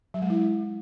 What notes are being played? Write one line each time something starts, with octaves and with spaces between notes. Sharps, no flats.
F#3
G#3
E4